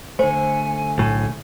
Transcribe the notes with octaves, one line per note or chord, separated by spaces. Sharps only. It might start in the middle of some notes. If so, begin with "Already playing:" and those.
D3 A3 C5 G#5
B1 A2